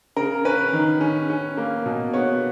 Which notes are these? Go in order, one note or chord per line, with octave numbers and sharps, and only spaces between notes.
C#3 A#4
C#4 B4
D#3
C#4
C#4
A#3
B2
B3 C#5